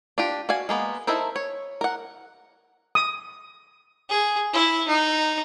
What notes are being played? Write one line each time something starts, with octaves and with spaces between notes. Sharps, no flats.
D4 F4 G4
F#4 D5 F5 G#5
G#3 A#3 B3
D#4 E4 A4 A#4 C5
C#5
A#4 F#5
D#6
G#4
E4
D#4